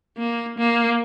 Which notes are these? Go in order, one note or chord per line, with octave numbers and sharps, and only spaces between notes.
A#3
A#3